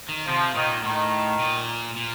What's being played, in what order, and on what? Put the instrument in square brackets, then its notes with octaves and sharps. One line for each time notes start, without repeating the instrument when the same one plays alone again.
[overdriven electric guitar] D#3
[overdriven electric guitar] C3 [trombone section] F3
[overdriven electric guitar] A#2 [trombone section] D#3
[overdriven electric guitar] A2 [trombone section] D#3
[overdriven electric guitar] A#2
A#2